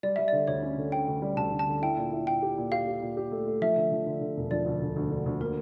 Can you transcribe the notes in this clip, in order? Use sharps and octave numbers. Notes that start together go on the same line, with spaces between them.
G3 D5
G3 E5
D3 D5
D2 C#5
C#4
D3
D3 G5
D2
G3
D2 A5
D2
A5
D3
E4 G5
A#2
E4
A#2 G5
G4
A#2
G4 F5
G4
A#2
G4
A3
A3
F3 E5
D3
F3
D3
D3
E1
F3 D5
D2
D2
D2
D3
D2
A#3 A#4